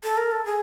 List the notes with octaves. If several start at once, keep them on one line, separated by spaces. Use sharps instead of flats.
A4
A#4
A4
G#4